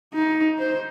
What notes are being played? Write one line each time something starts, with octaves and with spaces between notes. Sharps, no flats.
D#4
C5